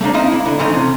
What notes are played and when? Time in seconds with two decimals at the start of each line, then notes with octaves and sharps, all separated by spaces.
0.01 A3 A#3 D4 D#4
0.14 A#3 C4 D#4 E4 D#5
0.32 E4
0.46 D3
0.59 G#2 E3 A3 C#4 D#4
0.74 C3